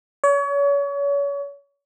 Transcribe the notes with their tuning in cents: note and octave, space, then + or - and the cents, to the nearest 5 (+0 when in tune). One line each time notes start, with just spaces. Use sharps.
C#5 +35